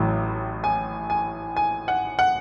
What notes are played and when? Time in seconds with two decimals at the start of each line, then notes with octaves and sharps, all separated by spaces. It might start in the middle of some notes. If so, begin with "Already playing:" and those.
Already playing: A1 A2 F#3
0.64 G#5
1.10 G#5
1.57 G#5
1.88 F#5
2.19 F#5